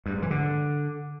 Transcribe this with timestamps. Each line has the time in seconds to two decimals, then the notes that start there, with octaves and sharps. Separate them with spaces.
0.06 G2
0.14 G#2
0.22 E3
0.31 D3